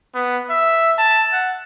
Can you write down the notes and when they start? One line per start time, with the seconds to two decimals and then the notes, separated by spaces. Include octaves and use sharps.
0.15 B3
0.50 E5
0.98 A5
1.33 F#5